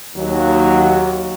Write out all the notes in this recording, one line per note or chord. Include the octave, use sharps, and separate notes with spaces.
D#2 F#3